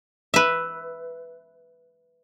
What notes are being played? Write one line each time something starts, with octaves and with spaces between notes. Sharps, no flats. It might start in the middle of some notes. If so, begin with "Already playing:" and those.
B4 E5